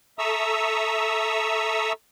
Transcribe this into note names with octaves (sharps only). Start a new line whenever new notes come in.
A4 E5 A#5 C#6 D#6 E6